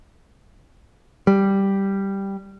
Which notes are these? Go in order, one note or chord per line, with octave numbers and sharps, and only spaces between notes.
G3